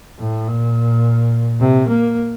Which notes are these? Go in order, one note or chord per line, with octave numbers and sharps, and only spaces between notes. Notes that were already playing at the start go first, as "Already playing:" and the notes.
A2
A#2
C3
A#3